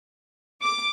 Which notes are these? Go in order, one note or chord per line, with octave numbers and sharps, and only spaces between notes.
D6